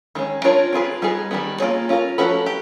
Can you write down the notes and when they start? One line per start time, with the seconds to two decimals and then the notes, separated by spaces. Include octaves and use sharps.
0.15 D#3 G#3 C#4
0.44 D4 F4 A#4 C#5
0.73 C4 F4 G#4 B4
1.02 G3 B3 D#4 G#4
1.31 D#3 G3 B3
1.60 A#3 D4 F4 G#4 C#5
1.89 C#4 F4 A#4
2.18 F3 A3 C#4 F#4 B4
2.46 G4